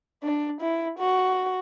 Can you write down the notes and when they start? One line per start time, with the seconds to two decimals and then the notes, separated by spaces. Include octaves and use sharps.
0.23 D4
0.61 E4
0.99 F#4